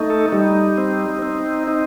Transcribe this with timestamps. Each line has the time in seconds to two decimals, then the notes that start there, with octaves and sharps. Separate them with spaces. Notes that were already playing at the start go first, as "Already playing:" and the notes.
Already playing: A3 D#4
0.10 A4
0.32 G3 D#4
0.78 C4
1.22 C4
1.68 D#4